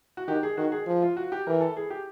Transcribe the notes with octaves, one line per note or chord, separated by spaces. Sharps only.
F#4
D#3 G4
G#4
D#3 F#4
G#4
F3
F4
F#4
G4
E3 A#4
A4
G#4
G4